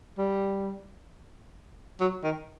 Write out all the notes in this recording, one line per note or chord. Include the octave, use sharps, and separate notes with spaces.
G3
F#3
D#3